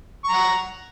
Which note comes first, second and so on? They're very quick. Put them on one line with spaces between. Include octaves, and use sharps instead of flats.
C#6 A#5 F#5